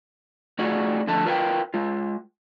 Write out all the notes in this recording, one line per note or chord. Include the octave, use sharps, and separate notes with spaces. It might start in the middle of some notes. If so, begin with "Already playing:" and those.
A3 D#4 F4 F#4 G#4 D5
D3 F3 A3 A4 A5
F4 A#4 B4 E5 F5 G5
G#3 F4